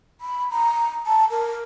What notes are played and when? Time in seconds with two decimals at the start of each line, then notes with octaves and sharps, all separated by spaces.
0.21 B5
0.51 A#5
1.06 A5
1.30 A#4